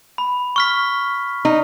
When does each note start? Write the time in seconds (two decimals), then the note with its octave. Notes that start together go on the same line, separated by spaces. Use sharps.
0.18 B5
0.56 C#6 F6 B6
1.45 D#4